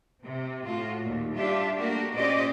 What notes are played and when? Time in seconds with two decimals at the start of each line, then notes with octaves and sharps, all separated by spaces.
0.24 C3
0.64 A2 F4 F#4
1.00 D#2 A#2
1.34 G3 D4 F4 G4 E5
1.77 A3 A#3 D4 F#4 G4 A#4
2.14 A#2 C#4 G4 C5 D5 D#5